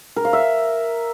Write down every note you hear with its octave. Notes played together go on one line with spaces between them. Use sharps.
A#4
F5
E5